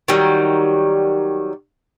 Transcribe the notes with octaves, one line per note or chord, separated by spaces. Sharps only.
D#3 F#3 G3